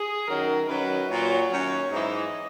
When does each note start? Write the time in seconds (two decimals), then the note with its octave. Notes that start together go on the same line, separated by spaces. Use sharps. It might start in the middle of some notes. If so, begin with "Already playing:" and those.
Already playing: G#4
0.28 F#2 D#3 F#3 A#4
0.67 F#2 D#3 F#3 B4
1.09 A#2 F#3 C#5
1.48 F#2 D#3 F#3
1.89 G#2 E3 D#5